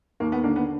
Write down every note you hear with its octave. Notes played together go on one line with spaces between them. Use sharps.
D#2 A#3
B3
D3 A#3 D4
B3